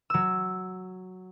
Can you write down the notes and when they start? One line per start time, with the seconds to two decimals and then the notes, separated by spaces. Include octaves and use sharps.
0.10 F#3 E6